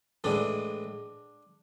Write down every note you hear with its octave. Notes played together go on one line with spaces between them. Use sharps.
A2 E3 G#3 D4